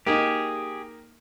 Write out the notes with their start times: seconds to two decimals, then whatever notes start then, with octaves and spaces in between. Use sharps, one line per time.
0.07 A#3 D#4 G4 G#4